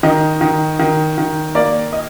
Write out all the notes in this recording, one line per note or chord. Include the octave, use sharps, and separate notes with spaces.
D#3 D#5
D#3
D#3
D#3
A#3 D5
D#5